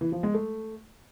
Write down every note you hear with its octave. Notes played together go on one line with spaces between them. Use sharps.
E3
F3
G#3
A3